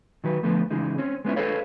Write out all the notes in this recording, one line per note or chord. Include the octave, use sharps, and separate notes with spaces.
D#3 F#3 B4
D2 F3 A3 B3 B4
C#3 E3 G#3 D#4
C4 C#4
G#3 B3 C#4 E4
G#4 A4 B4 C#5 F5